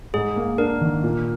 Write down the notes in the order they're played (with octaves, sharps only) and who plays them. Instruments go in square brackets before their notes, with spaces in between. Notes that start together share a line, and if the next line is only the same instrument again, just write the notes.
[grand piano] G#2 [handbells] G#4
[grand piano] A#3
[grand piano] D4 [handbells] A#4
[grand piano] D#3
A#2